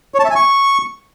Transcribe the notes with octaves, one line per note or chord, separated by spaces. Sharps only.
C#5
A5
E5
G#5
C#6